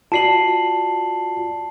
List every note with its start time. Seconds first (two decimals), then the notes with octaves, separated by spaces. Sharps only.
0.12 F4 F#4 D5 A5 C7 F#7